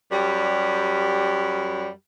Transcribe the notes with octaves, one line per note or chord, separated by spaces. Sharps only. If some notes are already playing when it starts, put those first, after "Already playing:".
F#2 G3